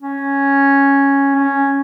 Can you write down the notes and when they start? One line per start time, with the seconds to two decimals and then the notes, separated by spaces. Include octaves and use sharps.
0.02 C#4
1.35 C#4